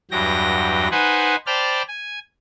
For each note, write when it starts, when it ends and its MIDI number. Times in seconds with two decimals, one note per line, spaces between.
0.11 0.88 40
0.11 0.88 43
0.11 0.88 54
0.11 0.88 79
0.11 0.88 94
0.91 1.36 63
0.91 1.36 71
0.91 1.36 72
0.91 1.36 78
0.91 1.36 80
1.46 1.82 72
1.46 1.82 74
1.46 1.82 79
1.46 1.82 81
1.46 1.82 83
1.46 1.82 89
1.88 2.19 80